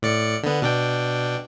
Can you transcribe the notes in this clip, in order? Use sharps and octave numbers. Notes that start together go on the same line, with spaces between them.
A2 D5 C#7
D3 B3
B2 D4 G5